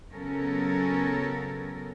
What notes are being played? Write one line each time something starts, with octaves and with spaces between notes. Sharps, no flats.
C#3 F#3 B3 C#4 A4 A#4